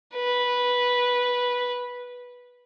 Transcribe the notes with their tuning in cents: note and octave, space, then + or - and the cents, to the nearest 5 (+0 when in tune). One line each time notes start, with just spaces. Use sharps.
B4 -10